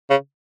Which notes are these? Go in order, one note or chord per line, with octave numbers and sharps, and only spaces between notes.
C#3